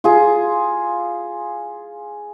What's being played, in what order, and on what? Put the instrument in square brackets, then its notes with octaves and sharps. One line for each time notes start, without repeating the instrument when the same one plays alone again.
[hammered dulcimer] F4 G#4